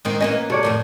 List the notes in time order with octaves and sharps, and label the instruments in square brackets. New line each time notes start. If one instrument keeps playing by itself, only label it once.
[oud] G#2 D#3 C4
[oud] E3 A#3 C#4 [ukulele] D#5
[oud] C3 [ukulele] A4 C#5 D5
[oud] F2 A2 D#3